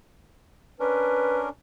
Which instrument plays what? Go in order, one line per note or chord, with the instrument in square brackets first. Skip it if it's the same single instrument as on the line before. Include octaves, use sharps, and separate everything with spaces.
[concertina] C#4 D4 A#4 [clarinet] B4